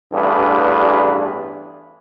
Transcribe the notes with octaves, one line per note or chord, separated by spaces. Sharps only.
A1 E2 G2 D4 B4